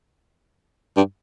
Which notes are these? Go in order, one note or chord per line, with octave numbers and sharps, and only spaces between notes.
G2